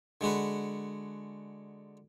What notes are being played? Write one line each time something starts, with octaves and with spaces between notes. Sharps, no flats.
D3 G#3 F#4 B4